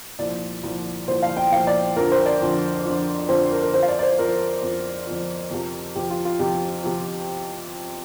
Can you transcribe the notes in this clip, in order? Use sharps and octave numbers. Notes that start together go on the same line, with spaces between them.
C2 A#2 F3 D5
C2 A#2 F3
C2 A#2 F3 C5
F5
G5
C2 A#2 F3 F5
D5
F2 D3 F3 A#4
C5
D5
F2 D3 F3
F2 D3 F3
F2 D3 F3 C5
A#4
A#4
F2 F3 C5
F5
D5
D5
C5
F2 F3 A#4
F2 F3
F2 F3
F2 C3 F3
F2 C3 F3 G4
F4
F4
F2 C3 F3 G4
C3 F3